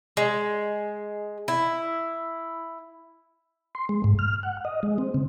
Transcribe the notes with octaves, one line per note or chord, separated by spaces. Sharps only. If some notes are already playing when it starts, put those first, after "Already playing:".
G#3
E4
C6
G#3
G#2
F6
F#5
D#5
G#3
C4
C#3